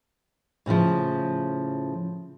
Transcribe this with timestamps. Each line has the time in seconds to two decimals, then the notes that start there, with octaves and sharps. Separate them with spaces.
0.66 A2 C#3 E3 F3